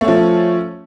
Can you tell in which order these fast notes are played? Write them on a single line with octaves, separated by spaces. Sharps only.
A3 C#4 F3